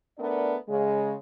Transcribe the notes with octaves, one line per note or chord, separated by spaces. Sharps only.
A3 B3 D4 A#4 D5
C#3 G#3